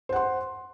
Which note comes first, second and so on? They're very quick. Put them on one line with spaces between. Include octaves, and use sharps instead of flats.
C5 F#5 C6